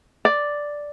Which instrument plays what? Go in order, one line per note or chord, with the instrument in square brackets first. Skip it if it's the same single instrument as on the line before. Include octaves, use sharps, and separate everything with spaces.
[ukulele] D5